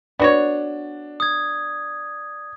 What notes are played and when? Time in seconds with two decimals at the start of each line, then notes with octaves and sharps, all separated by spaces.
0.20 B3 D4 F#4 C#5
1.20 D#6 G#6